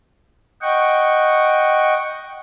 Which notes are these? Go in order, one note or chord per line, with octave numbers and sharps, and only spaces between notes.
D#5 F#5 G5 C#6